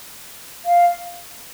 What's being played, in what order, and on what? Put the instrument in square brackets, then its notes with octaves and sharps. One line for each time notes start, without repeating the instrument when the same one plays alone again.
[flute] F5